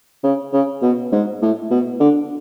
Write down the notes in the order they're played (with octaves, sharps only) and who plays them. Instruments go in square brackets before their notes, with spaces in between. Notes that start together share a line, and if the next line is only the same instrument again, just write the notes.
[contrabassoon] C#3
C#3
B2
G#2
A2
B2
D3